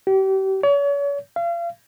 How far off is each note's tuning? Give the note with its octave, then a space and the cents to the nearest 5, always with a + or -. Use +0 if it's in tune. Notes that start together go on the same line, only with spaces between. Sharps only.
G4 -35
C#5 +40
F5 -35